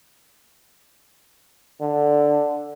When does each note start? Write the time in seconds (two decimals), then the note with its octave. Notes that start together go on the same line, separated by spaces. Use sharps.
1.81 D3